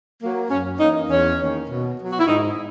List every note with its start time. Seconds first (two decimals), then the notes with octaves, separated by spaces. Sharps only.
0.22 F#3 A#3
0.50 F#2 C#4
0.80 E3 A#3 C#4 D#4
1.09 E2 C#4
1.39 D#3 A#3 C#4
1.69 B2
1.98 F#3 B3
2.11 F#4
2.20 E4
2.27 G#2 D#4